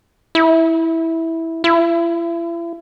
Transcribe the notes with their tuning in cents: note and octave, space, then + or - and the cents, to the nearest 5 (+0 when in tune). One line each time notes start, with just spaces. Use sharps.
E4 -10
E4 +40